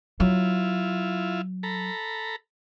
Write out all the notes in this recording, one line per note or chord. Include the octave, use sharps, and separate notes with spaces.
F#3 E4 F4
A4 A#5 B5